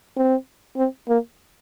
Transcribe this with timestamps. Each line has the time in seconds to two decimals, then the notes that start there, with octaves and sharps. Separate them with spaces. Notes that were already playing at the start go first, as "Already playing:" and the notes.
0.17 C4
0.77 C4
1.08 A#3